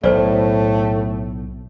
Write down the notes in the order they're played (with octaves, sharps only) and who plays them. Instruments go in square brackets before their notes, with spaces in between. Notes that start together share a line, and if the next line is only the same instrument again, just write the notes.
[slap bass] B1 [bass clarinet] A2 [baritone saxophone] A3 [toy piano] C5 D5